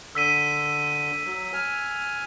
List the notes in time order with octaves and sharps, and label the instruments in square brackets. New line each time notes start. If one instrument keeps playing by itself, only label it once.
[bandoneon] D3 [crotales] E6 B6 D#7
[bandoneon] F#3
G#5 F6